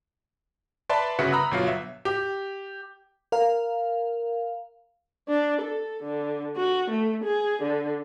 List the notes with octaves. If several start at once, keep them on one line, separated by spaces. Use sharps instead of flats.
B4 D5 E5 A5 B5 C6
G1 C#3 F#4 B4 E5 C#7
A#5 B5 D#6 E6 F#6
G1 B2 F#3 F4 F5
E5
G4
A#4 F5
D4
A4
D3
F#4
A3
G#4
D3